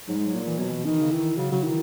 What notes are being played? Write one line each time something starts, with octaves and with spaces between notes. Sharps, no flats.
G#2 F#3
G#3
F#3
A#2
E3
B2 F#3
E3
D#3 E3
C#3
D#3 E3
C#3 F#3
C#3 F#3
D#3 E3